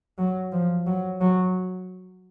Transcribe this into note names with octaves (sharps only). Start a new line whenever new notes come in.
F#3
F3
F#3
F#3